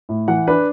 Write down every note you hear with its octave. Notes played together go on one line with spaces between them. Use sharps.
A2
E3 F#5
D4 B4